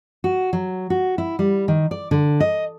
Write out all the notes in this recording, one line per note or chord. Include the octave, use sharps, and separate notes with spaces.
F#4
F#3
F#4
E4
G3
D#3
D5
D3
D#5